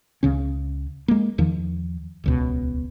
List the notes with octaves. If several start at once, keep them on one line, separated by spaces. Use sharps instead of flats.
C#2 C#3 C#4
G#3 A#3
E2 D#3 F3
D#1 C#2 B2